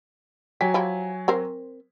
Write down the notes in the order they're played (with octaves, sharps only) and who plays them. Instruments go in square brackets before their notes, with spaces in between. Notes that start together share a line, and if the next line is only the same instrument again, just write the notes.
[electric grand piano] F#3 G#5 B6 [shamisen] G4
[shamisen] F3 E4 G4
C4 A#4 C5